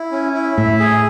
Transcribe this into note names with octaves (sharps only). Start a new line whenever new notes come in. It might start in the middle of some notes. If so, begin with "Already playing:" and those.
Already playing: E4
C#4
E4
A2 E5
G#4